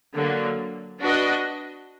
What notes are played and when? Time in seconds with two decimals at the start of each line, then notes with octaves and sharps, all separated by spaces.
0.14 D3 F#3 A#3
1.01 D4 F#4 B4 D#5